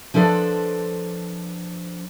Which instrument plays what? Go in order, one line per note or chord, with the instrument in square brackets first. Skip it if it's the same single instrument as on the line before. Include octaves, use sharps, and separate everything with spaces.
[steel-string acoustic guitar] F3 D4 A4 B4 C5